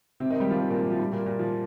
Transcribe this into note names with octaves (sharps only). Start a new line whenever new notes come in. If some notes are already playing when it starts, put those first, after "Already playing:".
C3 C4
D#3 D#4
G3 G4
F3 F4
D#3 D#4
A#2 A#3
G3
F3
G3
A#2 A#3
A#2 A#3
F3